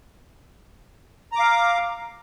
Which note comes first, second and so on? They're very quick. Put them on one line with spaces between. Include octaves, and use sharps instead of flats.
A#5 D6 F5